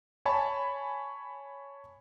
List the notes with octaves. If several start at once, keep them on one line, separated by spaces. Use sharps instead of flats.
C#5 G#5 A5 B5